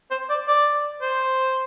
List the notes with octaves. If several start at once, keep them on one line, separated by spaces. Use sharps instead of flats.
C5
D5
D5
C5